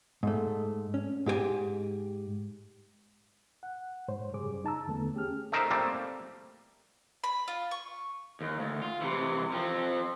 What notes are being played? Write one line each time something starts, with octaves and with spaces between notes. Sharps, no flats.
G#2 A3
C#4
G#2 G4 A#4 G#5
F#5
G#2 C5 C#5
F#2 C#3 G3 G#4 D6
D#4 A5 A#5 E6
E2 D3 A3 B3
C#4 G4 G#4 F6
A3 D#4 A#4 C5 E5
G3 A3 A#3 C4
B5
F4
C#6
D#2
D2
F4
C3 E3
F3 C4